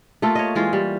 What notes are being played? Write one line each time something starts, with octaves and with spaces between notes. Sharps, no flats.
A3 A#3 F4 A4
C#5 D#5
E3 G#3 F4
G3